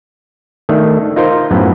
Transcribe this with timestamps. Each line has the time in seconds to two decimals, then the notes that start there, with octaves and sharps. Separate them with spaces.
0.69 D#3 A3 D4
1.16 D#4 F4 A#4 C5
1.51 F#2 A2 B3